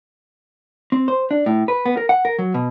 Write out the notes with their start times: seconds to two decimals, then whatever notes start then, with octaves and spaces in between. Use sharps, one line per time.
0.92 C4
1.08 C5
1.31 D4
1.46 A2
1.68 B4
1.86 B3
1.97 A#4
2.09 F#5
2.25 A#4
2.39 F#3
2.54 B2